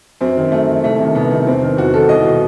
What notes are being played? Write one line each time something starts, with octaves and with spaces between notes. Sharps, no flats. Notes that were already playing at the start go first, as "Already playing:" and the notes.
F#2 C4
D#3
F#2 A3
D#3
C2 A3
C3 D#3
C2 B3
C3 D#3
E2 C4
D#3
E2 F#4
D#3 A4
C2 D#5
B2